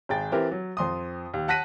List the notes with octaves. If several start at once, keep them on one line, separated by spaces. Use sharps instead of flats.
G#1 G#4 G5 A6
E3 C4 E4 G4 A#4 B4
F#3
F2 C6 D#6
D#2
F#5 A5 F#6 A#6 B6 D#7